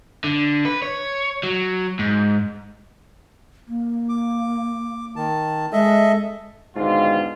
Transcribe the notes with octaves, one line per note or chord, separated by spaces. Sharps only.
D3
B4
C#5
F#3
G#2
A#3
D6
D#3 A5
G#3 A4 D#5 E5
G#2 B2 D3 D#3 F4